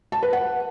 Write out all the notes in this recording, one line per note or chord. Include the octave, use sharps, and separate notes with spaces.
A5
B4
F#5